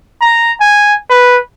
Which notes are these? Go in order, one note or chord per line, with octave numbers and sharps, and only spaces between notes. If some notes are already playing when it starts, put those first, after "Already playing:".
A#5
G#5
B4